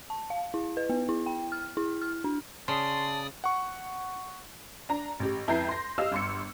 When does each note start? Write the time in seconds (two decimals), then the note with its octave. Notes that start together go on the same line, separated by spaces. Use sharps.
0.10 A5
0.30 F5
0.54 E4
0.77 B4
0.90 B3
1.09 E4
1.26 G5
1.52 F6
1.77 E4
2.02 F6
2.24 D4
2.68 C#3 D5 A5 C6 D#6
3.44 F#5 C#6
4.89 D4 A#5
5.20 A1 G4
5.48 F2 E4 B4 A#5 G6 C7
5.69 C6 A#6
5.98 G4 D#5 F5 E6 F6
6.12 G1 C6 C#7